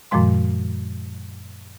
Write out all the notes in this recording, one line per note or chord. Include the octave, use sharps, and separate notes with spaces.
F#2 A#2 D#3 F3 G#3 C6